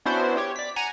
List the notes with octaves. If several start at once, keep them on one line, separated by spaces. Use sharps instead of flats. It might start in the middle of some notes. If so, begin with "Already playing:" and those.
B3 C#4 D4 E4 F#4 C5
G4 C#5
D5 B6
F#5 G#5 A#5